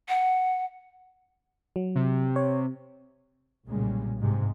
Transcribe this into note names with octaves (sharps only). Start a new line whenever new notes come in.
F#5
F#3
C3
C#5
B1 A#2 C#3 G3 G#3
G#2 C3 G#3